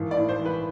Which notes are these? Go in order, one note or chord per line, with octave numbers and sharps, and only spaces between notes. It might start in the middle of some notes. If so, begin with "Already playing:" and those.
Already playing: G#1 E3
D5
A2
C5
E3
B4